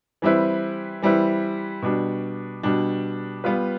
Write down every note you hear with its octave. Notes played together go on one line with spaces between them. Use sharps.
E3 G3 C4 E4 B4
E3 G3 C4 E4 B4
B2 G3 D4
B2 G3 D4
G3 B3 F4 B4